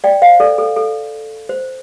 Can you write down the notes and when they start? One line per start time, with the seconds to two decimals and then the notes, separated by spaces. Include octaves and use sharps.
0.04 D5 G5
0.22 C5 F5
0.40 A4 D5
0.58 A4
0.76 A4
1.49 C5